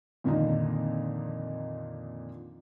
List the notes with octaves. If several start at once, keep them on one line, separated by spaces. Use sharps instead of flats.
F2 A#2 D3 D#3 D#4 D#5